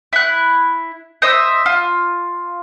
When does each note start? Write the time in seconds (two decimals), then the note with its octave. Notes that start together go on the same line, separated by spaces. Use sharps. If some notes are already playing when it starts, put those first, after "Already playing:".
0.13 E4 F#6
1.22 C5 D#5 E5 E6
1.66 F4